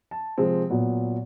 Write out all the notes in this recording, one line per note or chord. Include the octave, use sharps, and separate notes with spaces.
A5
C3 F3 G#3 C4
A#2 F#3 B3